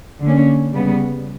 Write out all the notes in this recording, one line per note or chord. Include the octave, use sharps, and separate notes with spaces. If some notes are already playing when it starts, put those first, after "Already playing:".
D3 A#3 C#4
C#3 G3 B3